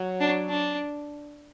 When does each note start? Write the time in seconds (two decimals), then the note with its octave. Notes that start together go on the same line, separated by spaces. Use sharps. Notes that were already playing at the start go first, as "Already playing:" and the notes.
Already playing: F#3
0.20 D4
0.50 D4